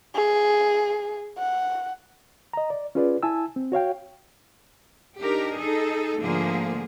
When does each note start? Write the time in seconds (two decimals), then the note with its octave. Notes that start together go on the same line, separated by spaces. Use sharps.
0.15 G#4
1.38 F#5
2.53 D#5 A#5
2.70 D5
2.95 C#4 F4 G#4 B4 D5
3.23 E4 G#5 A5 E6
3.56 C4
3.72 F#4 C#5 F5 G5
5.20 D4 D#4 G4 A#4
5.58 D#4 G#4 A4
6.19 G#2 D3 F3 A3 A#3 G#4